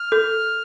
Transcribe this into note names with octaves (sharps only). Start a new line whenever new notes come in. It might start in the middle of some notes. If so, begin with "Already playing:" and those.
Already playing: F6
A4